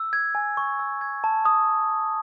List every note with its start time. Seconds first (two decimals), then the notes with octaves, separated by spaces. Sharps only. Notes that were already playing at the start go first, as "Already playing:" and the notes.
Already playing: E6
0.13 G#6
0.35 G#5
0.57 C#6
0.79 E6
1.01 G#6
1.24 A5
1.45 D#6